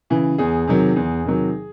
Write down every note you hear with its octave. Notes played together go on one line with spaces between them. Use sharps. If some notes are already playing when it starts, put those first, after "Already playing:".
C#3 E3
E2 G#4
C3 D#3 F#3
E2
C3 D#3 F#3